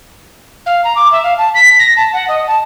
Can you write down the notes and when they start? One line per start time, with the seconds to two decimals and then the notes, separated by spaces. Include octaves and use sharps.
0.66 F5
0.84 A#5
0.96 D6
1.12 E5
1.23 F5
1.38 A5
1.55 B6
1.79 A#6
1.96 A5
2.13 F#5
2.28 D#5
2.47 A5